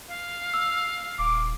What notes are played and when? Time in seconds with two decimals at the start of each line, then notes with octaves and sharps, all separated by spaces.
0.08 F5
0.54 E6
1.19 D#1 D6